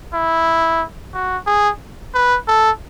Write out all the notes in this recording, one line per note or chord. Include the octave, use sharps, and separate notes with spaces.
E4
F#4
G#4
B4
A4